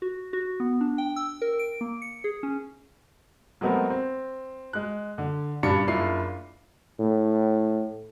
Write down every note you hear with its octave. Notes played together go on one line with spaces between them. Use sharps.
F#4
F#4
B3
D4
G5
E6
A#4
D7
A#3
C#7
G#4
C#4
F#3 G#3 A3 B3 C4 A#4
C4
G#3 F#6
D3
G2 A#2 C#3 D4 B5 C#7
F#1 A#3 D4 E4 F4 C7
A2